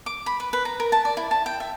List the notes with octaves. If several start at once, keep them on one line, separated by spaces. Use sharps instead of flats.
D6
B5
B4
B4
A#5
A#4
A5
D5
E4
A5
G5
E5